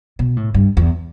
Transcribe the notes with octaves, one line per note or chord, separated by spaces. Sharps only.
B2
A2
G2
E2